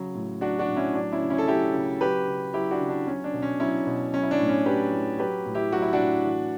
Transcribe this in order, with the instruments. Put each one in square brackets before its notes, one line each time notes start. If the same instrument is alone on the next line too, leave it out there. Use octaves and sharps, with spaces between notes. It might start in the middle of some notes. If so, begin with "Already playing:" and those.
Already playing: [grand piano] C#3 F#3
A2
F#3 D4 F#4
D4 F#4
A2
C#4 E4
F#3 D4
C#4 E4
C#3
C#4 E4
A4
F#3 E4 G4
C#3
F#3 G4 B4
C#3
F#3 E4 G4
D4 F#4
C#3
D4
F#3 C#4
D4
B2
C#4
F#3 C#4 E4
B2
F#3 C#4
E4
D4
A2
C#4
F#3 G4 B4
A2
F#3 G4 B4
A2
E4 G4
F#3 F#4
E4
D4 F#4
A2
E3